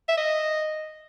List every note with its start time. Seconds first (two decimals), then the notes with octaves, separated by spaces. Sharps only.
0.09 E5
0.18 D#5